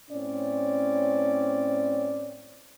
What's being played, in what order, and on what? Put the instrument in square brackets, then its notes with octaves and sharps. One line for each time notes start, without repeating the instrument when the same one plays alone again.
[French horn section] A2 C4 C#4 D5